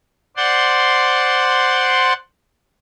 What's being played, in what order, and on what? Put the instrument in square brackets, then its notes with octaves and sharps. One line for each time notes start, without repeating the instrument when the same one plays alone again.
[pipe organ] C5 D5 F#5 C6